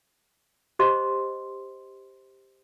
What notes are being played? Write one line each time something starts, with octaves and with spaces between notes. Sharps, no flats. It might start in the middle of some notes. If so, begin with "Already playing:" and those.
G4 C5 D#5 C6